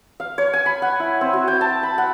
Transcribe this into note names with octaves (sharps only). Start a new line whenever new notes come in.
F5
C#5
G#5
B5
F#5
E4
C4
F#4
G5
A5
B5
F#5